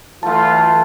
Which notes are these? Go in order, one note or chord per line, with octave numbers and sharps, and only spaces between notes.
E3 F#3 A3 F4 A5